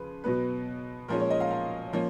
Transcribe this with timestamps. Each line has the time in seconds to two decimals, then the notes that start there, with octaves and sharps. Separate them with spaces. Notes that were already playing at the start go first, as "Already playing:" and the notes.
Already playing: C#3 F3 B4
0.24 B2 F#3 B3 B4
1.08 A#2 F3 G#3 C#4 A#4
1.20 C#5
1.30 D#5
1.40 F5
1.51 F5
1.93 F3 A#3 C#4